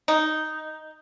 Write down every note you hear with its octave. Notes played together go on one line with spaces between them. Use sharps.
D#4